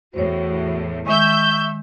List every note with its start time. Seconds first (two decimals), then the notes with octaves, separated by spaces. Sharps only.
0.14 E2 A2 F#4 C5 C#5
1.06 D#3 G#3 E5 C#6 E6 G6